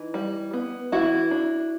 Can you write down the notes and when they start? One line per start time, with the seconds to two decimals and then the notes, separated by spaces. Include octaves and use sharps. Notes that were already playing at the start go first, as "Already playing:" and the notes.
Already playing: E3 D#4
0.14 G3
0.53 B3
0.92 E3 E4 F#4
1.31 D4